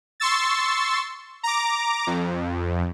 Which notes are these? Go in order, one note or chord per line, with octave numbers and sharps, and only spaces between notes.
C6 C#6 E6 A6
A#5 D6
F2